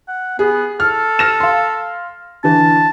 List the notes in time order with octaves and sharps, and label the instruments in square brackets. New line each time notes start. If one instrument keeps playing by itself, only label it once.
[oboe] F#5
[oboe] B3 [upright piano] G#4
[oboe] A4 [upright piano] F6
[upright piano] F6 A#6 E7
F5 C6
[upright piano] D3 E3 [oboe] A5